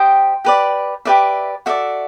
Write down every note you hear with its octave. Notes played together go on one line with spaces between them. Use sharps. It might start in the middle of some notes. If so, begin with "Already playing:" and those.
Already playing: G4 C5 D#5 G5
G4 B4 D5
G4 B4 D5 E5
F#4 A4 D5 E5